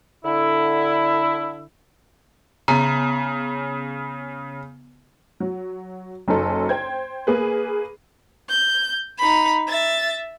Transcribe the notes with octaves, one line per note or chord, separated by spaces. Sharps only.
D3 E4
C#3 B3 A#5
F#3
F#1 F#2 D#4 A4
C5 G5 G#6
A#3 G#4 B4
G6
D#4 B5
E5 A6